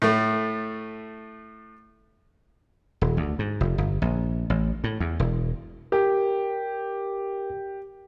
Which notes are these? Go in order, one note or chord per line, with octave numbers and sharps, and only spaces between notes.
A2 A3
D#1
D2
G#2
F1
G1
A#1
A1
A2
E2
E1
G4 A#4